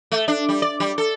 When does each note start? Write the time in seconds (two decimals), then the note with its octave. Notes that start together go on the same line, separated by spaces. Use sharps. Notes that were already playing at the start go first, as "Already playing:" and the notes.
0.12 A3
0.28 D4
0.49 G3
0.62 D5
0.80 G3
0.98 A4